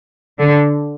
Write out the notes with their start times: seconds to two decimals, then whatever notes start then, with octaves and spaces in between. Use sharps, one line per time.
0.39 D3